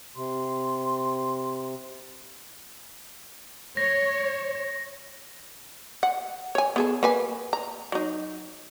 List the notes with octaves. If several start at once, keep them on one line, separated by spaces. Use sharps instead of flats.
C3 C6
C#5 A#6
F#5
C#5 G#5
B3 G#4 A4
A#3 B4 G#5
A#5
F#3 D#4